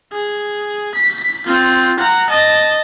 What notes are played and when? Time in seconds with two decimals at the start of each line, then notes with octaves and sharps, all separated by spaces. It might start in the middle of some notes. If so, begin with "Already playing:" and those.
0.13 G#4
0.95 B6
1.46 C4 F4
1.99 F#5 A#5
2.29 D#5 A5